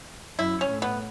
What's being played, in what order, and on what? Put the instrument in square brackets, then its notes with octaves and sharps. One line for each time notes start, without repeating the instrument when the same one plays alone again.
[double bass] F#2 [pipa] E4
[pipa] C#4
[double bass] A2
[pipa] B3